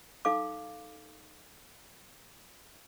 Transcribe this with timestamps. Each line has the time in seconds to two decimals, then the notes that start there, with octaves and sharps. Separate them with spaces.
0.25 D#4 A4 F5 D6